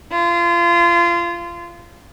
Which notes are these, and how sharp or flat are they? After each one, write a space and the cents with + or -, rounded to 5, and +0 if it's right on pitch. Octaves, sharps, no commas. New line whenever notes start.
F4 -25